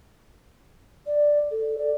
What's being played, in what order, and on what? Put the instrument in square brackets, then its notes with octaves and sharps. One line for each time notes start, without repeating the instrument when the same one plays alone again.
[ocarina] D5
A4
D5